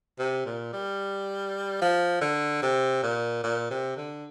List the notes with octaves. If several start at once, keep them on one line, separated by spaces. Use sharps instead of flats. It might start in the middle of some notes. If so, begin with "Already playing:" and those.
C3
A#2
G3
F3
D3
C3
A#2
A#2
C3
D3